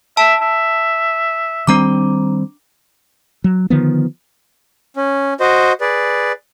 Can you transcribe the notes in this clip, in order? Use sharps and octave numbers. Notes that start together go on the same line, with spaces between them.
E5 A5
E5
D#3 G3 C4 D4 A#5 D6
F#3
D3 D#3 F3 B3
C#4
F#4 C5 D#5
G#4 B4 D5